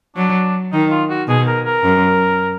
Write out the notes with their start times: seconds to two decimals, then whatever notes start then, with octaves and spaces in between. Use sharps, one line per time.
0.16 F#3 D4
0.73 D#3 D#4
0.91 F4
1.10 F#4
1.28 B2 G#4
1.47 A#4
1.66 A#4
1.84 F#2